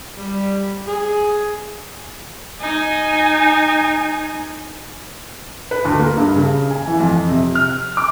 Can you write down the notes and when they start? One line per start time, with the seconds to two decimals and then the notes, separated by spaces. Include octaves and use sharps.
0.18 G3
0.88 G#4
2.61 D#4 G#5
5.71 B4
5.85 D2
5.99 A#3
6.17 G2
6.35 C#3
6.71 G#5
6.87 E3
7.00 F2
7.29 C3
7.55 F6
7.97 D6